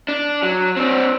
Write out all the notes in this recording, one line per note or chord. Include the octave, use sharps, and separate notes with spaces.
D4
F#3
C4 D4